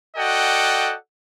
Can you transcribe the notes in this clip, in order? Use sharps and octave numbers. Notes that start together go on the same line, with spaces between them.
F#4 A4 D5 D#5 F#5 G5